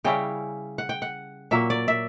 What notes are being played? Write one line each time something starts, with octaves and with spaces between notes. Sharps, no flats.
C#3 G3 C#4 E4 G5
F#5
G5
F#5
A#2 F#3 A#3 E5
D5
E5